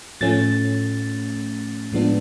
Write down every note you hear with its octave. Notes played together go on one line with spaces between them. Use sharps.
A2 F3 A3 C#4 A6
A2 F3 G#3 B3 D4